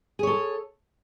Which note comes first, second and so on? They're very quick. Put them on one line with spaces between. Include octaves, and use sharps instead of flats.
G#4 C#5 A4